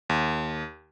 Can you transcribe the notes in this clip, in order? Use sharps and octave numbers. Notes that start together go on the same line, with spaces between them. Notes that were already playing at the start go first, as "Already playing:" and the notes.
D#2